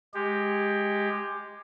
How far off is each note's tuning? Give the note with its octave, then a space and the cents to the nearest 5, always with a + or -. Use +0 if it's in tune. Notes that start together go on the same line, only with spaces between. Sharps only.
G#3 +0 G4 +15